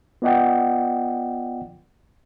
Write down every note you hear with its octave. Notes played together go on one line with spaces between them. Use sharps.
B3 F4 D5 D#5 F#5 G5